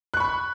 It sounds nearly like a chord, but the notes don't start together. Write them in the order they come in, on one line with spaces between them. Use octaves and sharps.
F#6 C#6 B5